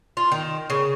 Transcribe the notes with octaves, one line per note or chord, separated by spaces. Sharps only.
F4
D#3
C#3